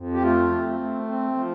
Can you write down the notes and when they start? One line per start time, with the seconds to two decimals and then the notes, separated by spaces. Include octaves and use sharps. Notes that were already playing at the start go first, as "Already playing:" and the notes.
Already playing: F2
0.13 G4
0.22 A3 F4
0.50 C4
0.79 A3
1.08 C4
1.36 F3